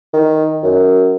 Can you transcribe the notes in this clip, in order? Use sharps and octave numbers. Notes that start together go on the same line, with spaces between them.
D#3
F#2